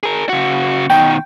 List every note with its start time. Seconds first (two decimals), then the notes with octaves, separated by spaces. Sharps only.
0.03 G#4 A#4
0.29 C#3 F#4
0.90 B2 D#3 G5